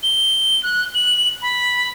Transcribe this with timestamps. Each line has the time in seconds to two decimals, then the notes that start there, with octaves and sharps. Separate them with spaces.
0.03 G7
0.63 F#6
0.95 F#7
1.42 B5